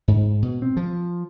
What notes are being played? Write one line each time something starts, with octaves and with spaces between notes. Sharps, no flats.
G#2
B2
C4
F3